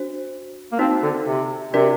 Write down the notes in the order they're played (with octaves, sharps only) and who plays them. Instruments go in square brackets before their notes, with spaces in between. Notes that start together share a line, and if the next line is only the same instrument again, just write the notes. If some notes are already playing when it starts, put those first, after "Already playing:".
Already playing: [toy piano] D4 F#4 C5
[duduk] A#3
[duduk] C4 [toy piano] D#4 F#4 C5
[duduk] D3
C3
[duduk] C3 [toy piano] D4 F#4 A#4 D5